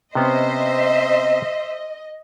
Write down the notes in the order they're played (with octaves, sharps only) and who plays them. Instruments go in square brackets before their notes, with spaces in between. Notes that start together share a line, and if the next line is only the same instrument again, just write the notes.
[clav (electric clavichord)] C3 B3 C#4 [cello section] C5 E5 [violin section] D#5